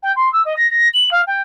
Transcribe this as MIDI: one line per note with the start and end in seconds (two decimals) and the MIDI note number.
0.02 0.12 79
0.16 0.31 84
0.32 0.42 88
0.45 0.53 75
0.56 0.69 94
0.70 0.88 94
0.93 1.10 102
1.11 1.21 77
1.27 1.42 79